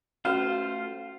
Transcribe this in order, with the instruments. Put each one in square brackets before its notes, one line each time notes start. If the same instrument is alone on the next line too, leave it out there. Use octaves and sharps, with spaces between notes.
[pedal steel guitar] A3 F4 C5 [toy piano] C#4 F#4 B4 [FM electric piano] F5